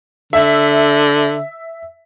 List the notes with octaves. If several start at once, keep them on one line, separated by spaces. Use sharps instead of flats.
D3 E5